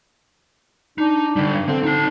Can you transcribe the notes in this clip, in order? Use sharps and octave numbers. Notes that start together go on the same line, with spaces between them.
D4 D#4
D3 G3
G2
D3 C4
D#4 A5